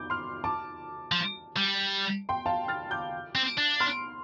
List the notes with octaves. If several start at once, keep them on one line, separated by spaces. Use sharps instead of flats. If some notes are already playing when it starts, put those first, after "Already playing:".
Already playing: D6 G6
C6 F6
A5 D6
F3
G3
G5 C6
F5 A5
F6 A6
D6 G6
C4
D4
C6 F6